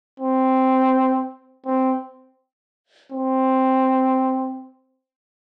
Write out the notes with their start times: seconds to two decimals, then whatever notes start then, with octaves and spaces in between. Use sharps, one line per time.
0.20 C4
1.66 C4
3.12 C4